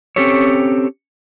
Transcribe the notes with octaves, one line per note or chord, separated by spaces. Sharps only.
C4 C#4 G4 A4 C#5